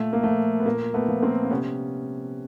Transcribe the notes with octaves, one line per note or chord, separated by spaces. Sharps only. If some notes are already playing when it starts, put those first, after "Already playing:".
Already playing: A#2 A3
A#3
F3 A3
B3
A#2 A#3
A3 B3
F3
A#3 C4
C4
C3 B3 C#4